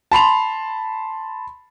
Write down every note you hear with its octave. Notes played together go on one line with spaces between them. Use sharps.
A5 B5 C6 F7